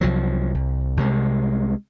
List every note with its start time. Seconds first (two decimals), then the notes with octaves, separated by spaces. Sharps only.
0.01 C2 F3 F#3
0.55 C2
0.97 C2 C3 G#3